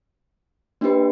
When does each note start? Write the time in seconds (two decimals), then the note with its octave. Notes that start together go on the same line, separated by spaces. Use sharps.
0.81 A#3 D4 G4 B4